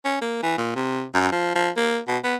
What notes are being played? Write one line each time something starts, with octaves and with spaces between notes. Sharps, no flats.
C#4
A#3
E3
A#2
C3
F#2
F3
F3
A#3
B2
B3